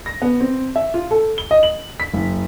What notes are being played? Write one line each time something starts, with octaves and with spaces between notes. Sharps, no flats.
A#6
B3
C4
E5
F4
A4
G7
D#5
F#7
B6
F#1